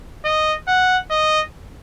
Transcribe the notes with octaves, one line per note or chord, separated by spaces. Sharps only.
D#5
F#5
D#5